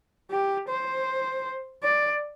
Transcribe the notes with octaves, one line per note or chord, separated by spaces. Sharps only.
G4
C5
D5